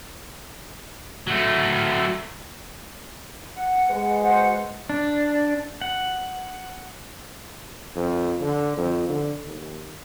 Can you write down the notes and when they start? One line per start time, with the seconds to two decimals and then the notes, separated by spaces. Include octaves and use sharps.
1.28 F#3 A3
3.55 F#5
3.90 G#3 B4
4.21 F#4 C5 F#5
4.89 D4
5.81 F#5
7.96 F2
8.41 D3
8.77 F2
9.09 D3
9.46 D#2